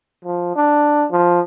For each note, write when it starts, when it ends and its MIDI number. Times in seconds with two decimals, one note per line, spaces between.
0.25 0.54 53
0.56 1.06 62
1.11 1.40 53